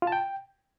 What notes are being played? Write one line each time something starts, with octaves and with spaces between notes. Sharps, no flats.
F4
A5
G5